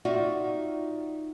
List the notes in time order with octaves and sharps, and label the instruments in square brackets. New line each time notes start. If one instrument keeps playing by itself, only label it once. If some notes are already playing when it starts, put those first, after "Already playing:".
[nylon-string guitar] D#4 F4 F#4 D5 E5